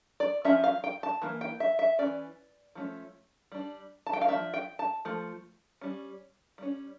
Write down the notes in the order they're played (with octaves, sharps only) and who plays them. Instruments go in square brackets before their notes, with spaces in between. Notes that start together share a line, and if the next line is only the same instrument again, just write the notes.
[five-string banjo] D5
F3 C#4 E5
F5
G5
A5
E3 A#3
G5
E5
E5
A3 C#4 D5
E3
F3 A3 C#4
G3 D4
A5
G5
F5
A3 D4 E5
F3
G5
A5
F3 A3
G3 C#4
G3 C#4